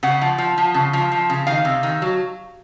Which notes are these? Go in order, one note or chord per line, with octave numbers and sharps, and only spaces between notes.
C#3 F#5
F3
F3
F3
C#3
F3
F3
C#3
D#3 F5
C3
D#3
F#3